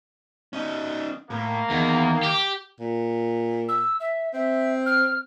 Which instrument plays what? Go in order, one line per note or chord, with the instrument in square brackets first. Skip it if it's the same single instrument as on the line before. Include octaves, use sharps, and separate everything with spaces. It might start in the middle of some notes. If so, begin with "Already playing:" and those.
[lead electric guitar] C#4 D#4
[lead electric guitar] A2 [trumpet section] A#3
[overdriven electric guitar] E2 [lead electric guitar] D#3
[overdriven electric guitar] G4
[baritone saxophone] A#2
[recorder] E6
E5
[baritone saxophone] C4 [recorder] E5
[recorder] F6